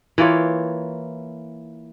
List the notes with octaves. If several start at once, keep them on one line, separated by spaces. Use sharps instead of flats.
E3 A#3 F4 C#5